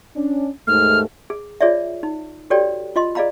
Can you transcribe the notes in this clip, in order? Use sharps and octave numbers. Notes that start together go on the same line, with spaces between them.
C#4 D4
D#2 G#2 A3 F6
G#4
F4 G#4 C#5 D5 E5
D#4
F#4 G4 A4 C#5 D5 G5
F4 D#5 C6
G#4 D5 D#5 F5 A#5 B5